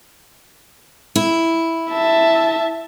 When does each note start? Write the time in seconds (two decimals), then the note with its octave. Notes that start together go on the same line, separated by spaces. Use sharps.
1.16 E4
1.90 E5 A5